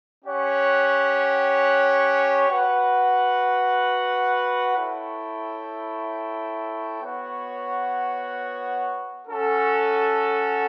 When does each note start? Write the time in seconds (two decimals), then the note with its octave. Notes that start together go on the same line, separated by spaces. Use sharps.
0.23 C#4 G4 C#5 F#5
2.49 F#4 B4 F#5
4.75 E4 A4 C#5 G5
7.02 B3 F#4 C#5 F#5
9.28 C#4 F#4 A4